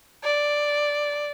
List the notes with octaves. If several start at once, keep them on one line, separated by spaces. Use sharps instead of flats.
D5